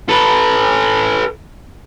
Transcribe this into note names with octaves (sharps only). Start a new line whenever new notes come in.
A4 B4